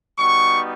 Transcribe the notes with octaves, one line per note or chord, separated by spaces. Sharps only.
G3 B3 D#4 F#4 C#6